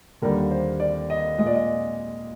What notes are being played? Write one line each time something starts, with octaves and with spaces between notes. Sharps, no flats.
D#2 D3 G3 A#3 A#4
C5
D5
D#5
G#3 D#5
A#2 D5
D#5